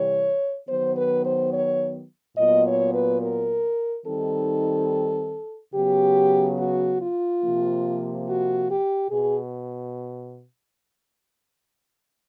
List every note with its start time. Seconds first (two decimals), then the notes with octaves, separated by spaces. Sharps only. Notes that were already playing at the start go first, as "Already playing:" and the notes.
Already playing: C3 E3 G3 C#5
0.69 D#3 F#3 B3 C5
0.97 B4
1.25 C5
1.53 C#5
2.37 A#2 F#3 B3 D#5
2.66 C#5
2.94 B4
3.21 A#4
4.06 D#3 G3 C4 D#4 A4
5.74 C#3 F#3 B3 G4
6.58 F#4
7.01 F4
7.42 C3 F3 A#3
8.27 F#4
8.69 G4
9.11 B2 G#4